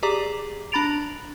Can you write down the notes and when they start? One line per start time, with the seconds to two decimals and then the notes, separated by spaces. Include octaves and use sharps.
0.03 G4 G#4 D5 A#5 D6
0.72 D4 A#5 B5 A6 D7 F7